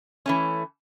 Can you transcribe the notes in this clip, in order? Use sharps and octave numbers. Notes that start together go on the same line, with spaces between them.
E3 A3 C#4